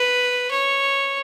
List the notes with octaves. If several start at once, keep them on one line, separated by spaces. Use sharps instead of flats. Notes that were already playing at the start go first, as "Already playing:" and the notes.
Already playing: B4
C#5